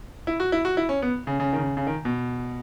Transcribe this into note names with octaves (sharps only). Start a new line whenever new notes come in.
E4
F#4
E4
F#4
E4
C#4
B3
C#3
C#3
D#3
C#3
C#3
D#3
B2